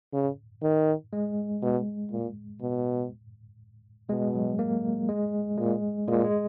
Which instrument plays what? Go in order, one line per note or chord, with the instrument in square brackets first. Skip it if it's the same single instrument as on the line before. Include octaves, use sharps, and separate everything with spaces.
[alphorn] C#3
D#3
[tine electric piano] G#3
[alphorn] B2
A#2
B2
[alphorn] B2 [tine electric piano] G#3
[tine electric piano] F#3
A#3
G#3
[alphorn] A#2 [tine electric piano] G#3
[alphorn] A#2 [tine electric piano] G#3
[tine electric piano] G#3